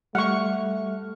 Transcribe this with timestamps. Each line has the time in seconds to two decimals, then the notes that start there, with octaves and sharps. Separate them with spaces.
0.15 G3 A3 F#5 C#6 F6